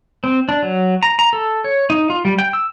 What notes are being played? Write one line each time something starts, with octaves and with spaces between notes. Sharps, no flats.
C4
D4
F#3
A#5
A#5
A4
C#5
D#4
F4
G3
G5
E6